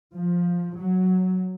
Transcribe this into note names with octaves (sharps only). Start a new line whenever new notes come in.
F3
F#3